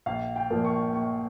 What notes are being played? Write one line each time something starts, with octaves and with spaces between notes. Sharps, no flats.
A#1 F5
G5
A#2 F3 A#3
C#6
A#1 C#6